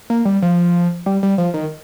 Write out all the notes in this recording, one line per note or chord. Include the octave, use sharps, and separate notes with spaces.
A#3
G3
F3
G3
G3
F3
D#3